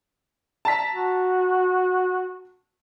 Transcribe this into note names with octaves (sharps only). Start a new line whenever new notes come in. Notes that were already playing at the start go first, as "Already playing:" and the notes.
A5 A#5 B6
F#4